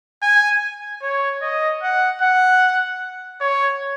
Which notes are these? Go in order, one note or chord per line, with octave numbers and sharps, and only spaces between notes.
G#5
C#5
D#5
F#5
F#5
C#5